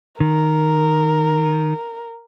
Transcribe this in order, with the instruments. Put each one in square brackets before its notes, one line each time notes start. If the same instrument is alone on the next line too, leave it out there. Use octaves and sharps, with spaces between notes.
[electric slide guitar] D#3 [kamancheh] A#4